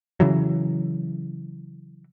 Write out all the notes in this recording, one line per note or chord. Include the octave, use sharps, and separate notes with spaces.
C#3 E3 F#3